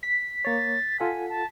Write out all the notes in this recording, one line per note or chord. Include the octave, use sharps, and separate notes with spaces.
B6
A#3 C#5 A6
F4 A4 F#5 G#5
A5